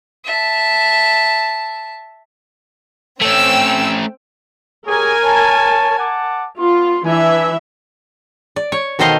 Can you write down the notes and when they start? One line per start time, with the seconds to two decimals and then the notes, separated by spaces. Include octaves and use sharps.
0.25 E5 A5
3.22 A3 C4 C#4 G5 E6
4.86 G4 G#4 A#4 C#5 G#5
5.23 C#5 A5
5.99 F#5 A5 D6
6.59 B3 F4 C6
7.05 E3 D4 B4 E5 G#5
8.56 D5
8.72 C#5
8.99 B2 D#3 A4 C5 D#5 F5